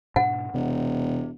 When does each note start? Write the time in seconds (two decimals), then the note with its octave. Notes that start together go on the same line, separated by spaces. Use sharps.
0.16 G#2 B2 D4 F#5
0.54 E1 C3